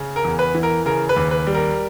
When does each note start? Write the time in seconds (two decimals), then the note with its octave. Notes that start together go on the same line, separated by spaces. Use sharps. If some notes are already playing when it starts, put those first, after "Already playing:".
Already playing: C#3
0.16 A#4
0.24 E2
0.39 B4
0.55 E3
0.63 A#4
0.86 C#3 A#4
1.09 B4
1.16 D#2
1.31 B4
1.47 G3
1.55 A#4